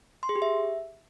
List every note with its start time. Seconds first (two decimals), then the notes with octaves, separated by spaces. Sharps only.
0.23 C6
0.29 G#4
0.36 G4
0.42 E5